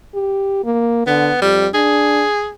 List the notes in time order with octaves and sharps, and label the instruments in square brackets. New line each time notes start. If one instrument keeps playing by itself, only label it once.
[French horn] G4
A#3
[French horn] D3 [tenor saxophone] B3
[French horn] F2 [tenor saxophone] G3
[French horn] D4 [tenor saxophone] G#4